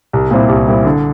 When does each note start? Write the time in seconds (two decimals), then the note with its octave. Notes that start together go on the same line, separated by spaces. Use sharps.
0.13 C2
0.31 A#2 G3 C4 E4
0.49 C2
0.67 A#2 G3 C4 E4
0.85 D3